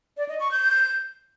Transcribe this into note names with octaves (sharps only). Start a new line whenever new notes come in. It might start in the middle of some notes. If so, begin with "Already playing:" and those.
D5
D#5
C#6
G6